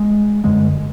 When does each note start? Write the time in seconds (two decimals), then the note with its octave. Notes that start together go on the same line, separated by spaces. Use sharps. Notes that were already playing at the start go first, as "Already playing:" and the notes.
Already playing: G#3
0.44 F#2 D3 G#3